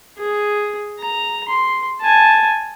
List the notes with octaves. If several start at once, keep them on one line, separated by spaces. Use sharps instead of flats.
G#4
A#5
C6
G#5 A5